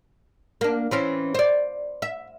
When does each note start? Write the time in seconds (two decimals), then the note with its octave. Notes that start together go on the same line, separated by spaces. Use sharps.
0.61 A#3 D4
0.91 E3 C4 C#4
1.35 C5 D5
2.02 E5